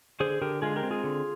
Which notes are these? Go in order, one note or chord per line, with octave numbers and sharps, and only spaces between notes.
D3 G#4 C5
D3 G4 A#4
G#3 F4 G#4
G4 A#4
C4
F4 G#4
D3